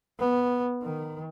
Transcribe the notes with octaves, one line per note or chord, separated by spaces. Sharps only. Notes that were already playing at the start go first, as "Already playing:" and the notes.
B3
D#3